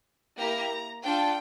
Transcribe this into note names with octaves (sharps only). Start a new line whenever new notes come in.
A#3 E4 G4 A#5
D4 F4 A4 G5